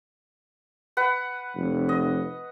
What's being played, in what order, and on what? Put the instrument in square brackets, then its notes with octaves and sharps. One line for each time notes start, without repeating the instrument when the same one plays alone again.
[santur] B4 F#5
[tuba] F1
[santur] D#5